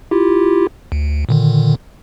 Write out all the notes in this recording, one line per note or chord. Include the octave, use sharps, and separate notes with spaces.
E4 F4 G4
D2
A#2 D3 D#3